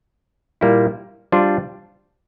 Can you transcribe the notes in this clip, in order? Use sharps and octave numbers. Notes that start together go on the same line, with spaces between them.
A#2 G3 A#3 E4
G3 D4 F4 C5